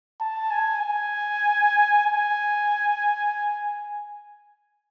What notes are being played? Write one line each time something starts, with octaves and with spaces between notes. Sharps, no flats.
A5
G#5
G#5
G#5